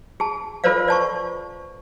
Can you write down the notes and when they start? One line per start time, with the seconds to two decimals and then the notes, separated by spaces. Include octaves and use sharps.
0.20 G#4 A5
0.64 F4 A4 B4 C5 D5 F5
0.88 D5 A5 C#6